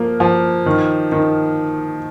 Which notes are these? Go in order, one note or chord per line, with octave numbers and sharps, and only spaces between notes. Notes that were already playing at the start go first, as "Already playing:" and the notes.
Already playing: F3 A#3
F3
D#3
D#3